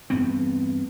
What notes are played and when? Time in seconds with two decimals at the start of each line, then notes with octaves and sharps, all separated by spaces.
0.10 E2 G2 B3 C4